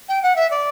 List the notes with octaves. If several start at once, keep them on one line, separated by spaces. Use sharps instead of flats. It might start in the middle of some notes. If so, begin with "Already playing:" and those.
G5
F#5
E5
D5